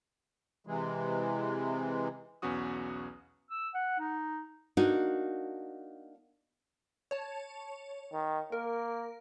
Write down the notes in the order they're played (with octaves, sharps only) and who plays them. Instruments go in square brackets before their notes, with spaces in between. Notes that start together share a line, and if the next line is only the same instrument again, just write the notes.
[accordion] C3 E3 G#3
[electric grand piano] B1 E2 B3 C#4 F#4 D#6
[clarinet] E6
F#5
D#4
[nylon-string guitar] A#3 D4 D#4 F#4
[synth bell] C#5 A5
[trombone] D#3
[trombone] A#3 [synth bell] A#4